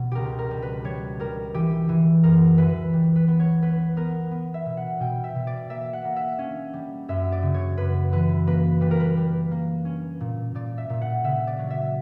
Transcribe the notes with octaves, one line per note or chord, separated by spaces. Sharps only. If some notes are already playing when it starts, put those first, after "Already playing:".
Already playing: B2 G3
C#2 G4 A#4
A#4
G3
B4
G3 C#5
G3 A#4
E3 G4
E3
F#2 A#4
E3 B4
G3
B4
B3
C#5
B3 B4
B3 A#4
B3
E5
B2
F#5
B2 G5
E5
B2
D5
A#3 E5
F#5
A#3
E5
C#4
G3
F#2 E5
D5
C#3
C#5
F#2 B4
E3 B4
A#3 B4
G3 B4
A#4
B4
G3
A#3
C#4
A#2
A#2 D5
E5
A#2
F#5
C#3 E5
D5
F#3
E5